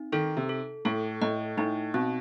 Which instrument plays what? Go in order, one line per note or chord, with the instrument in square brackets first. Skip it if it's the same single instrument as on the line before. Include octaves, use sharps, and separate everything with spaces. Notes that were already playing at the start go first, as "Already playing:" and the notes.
Already playing: [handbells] C4 D#4
[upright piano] D#3 [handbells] A4
[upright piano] C3
[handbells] A4
[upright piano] A2 [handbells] A4
[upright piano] A2 [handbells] D#5
[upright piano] A2 [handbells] D#4
[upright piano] B2 [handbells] C4